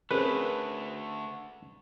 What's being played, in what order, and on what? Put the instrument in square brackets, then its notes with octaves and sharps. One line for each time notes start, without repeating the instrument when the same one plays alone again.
[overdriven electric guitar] D3 A3 [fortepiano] C4 C#4 G#4 [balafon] A#4 [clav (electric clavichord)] B4